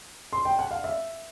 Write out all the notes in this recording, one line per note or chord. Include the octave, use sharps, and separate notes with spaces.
C6
G5
F#5
F5
E5